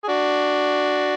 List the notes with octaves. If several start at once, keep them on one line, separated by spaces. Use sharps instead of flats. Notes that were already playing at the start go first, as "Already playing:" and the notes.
G#4
D4 F#4